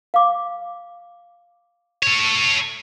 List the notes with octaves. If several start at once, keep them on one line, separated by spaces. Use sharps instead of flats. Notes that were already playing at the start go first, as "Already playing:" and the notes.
F5 D6
A4 C#5